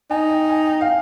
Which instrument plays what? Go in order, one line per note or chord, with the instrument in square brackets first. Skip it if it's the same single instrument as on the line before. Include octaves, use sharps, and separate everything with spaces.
[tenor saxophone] D#4 [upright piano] G#5
[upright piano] G5
G#5
G5
F5